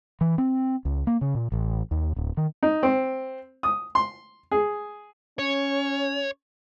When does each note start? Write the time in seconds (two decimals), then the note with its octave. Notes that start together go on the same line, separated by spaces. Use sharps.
0.21 E3
0.38 C4
0.85 C#2
1.07 A#3
1.21 C#3
1.35 A#2
1.52 A1
1.91 D#2
2.16 D1
2.37 D#3
2.63 D#4
2.83 C4
3.63 D#6
3.95 C6
4.51 G#4
5.39 C#4 C#5